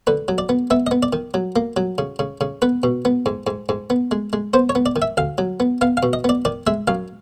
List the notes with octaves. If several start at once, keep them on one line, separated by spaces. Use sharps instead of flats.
D3 B4
F#3
D5
B3
B3 E5
D#5
B3
D5
D#3
F#3
A#3
F#3
C#3
C#3
C#3
B3 B4
B2
B3
G#2
G#2
G#2
B3
G#3
G#3
B3 C5
C#5
B3
D5
D#3
E5
D2 F5
F#3
B3
B3 F5
F5
B2
D#5
B3 D5
D#3 D5
G#3 E5
F#2 F5